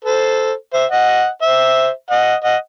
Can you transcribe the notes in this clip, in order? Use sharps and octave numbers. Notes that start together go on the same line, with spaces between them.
A4 C5
C5 E5
D#5 F#5
C5 E5
D#5 F#5
D#5 F#5